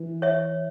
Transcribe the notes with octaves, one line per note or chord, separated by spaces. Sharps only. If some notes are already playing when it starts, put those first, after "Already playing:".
Already playing: E3
C#5 E5